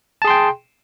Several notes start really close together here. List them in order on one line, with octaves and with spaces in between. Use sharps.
A5 G#4 C6 G5